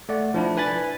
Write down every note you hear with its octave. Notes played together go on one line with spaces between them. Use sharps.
A3 D5 F#5
F3 D4 E4
B4 G#5 B5 A6